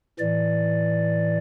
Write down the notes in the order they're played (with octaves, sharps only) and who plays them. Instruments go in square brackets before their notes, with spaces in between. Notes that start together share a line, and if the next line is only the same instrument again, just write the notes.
[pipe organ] A2 E3 D5